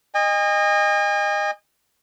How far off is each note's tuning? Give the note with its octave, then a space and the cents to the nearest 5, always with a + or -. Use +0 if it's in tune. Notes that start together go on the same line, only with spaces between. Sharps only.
D#5 -15 G#5 -45